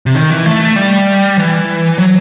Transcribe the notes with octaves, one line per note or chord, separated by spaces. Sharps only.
C3
D#3
E3
A3
G3
E3
F#3